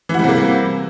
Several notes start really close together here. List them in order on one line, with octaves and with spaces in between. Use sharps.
E3 F#4 G3 C3 A#3